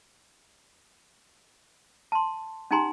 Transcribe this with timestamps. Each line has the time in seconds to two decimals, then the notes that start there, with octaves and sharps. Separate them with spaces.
2.12 A5 C6
2.71 C#4 D#4 G4 G#5 A#5 C6